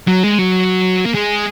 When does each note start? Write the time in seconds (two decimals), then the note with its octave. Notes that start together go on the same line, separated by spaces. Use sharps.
0.08 F#3
0.24 G#3
0.39 F#3
1.05 A#3
1.14 G#3